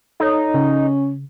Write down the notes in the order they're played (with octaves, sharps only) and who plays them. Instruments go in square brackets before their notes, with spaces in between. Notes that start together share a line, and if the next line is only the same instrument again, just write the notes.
[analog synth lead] D#4 [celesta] A4 C#5
[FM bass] C#3 [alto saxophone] C#4